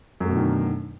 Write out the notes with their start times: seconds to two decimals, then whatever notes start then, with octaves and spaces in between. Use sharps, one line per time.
0.20 F#2
0.25 A3
0.29 B2
0.33 D3
0.37 D#3